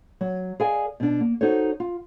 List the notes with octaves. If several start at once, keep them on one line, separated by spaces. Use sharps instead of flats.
F#3
G#4 A#4 D5 D#5 F5 G#5
B2 D4
A#3
D#4 F#4 A4 C5 C#5
F4